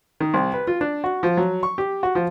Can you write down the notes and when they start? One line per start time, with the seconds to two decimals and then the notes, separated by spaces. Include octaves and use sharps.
0.20 D#3
0.34 C2
0.54 B4
0.67 F4
0.81 D4
1.04 F#4
1.23 F3
1.37 F#3
1.63 C#6
1.78 G4
2.03 F#4
2.15 F3